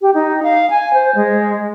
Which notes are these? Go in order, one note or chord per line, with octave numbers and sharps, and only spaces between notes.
G4
D#4
F5
G#5
C5
G#3